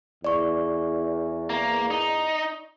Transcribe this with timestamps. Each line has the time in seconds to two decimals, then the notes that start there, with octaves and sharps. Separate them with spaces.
0.24 E2 D5 C#6
1.50 A#3
1.91 D#4